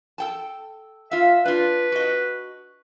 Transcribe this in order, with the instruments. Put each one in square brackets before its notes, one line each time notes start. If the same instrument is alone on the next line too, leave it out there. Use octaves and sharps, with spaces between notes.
[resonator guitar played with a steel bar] A4 G5 A5
[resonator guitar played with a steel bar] F4 F5 [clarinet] E5
[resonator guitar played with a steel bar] D4 F4 [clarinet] B4
[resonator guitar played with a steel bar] F#4 D#5